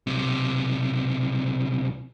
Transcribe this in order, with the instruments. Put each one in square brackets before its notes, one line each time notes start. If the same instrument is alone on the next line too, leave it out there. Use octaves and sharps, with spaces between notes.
[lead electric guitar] B1 C3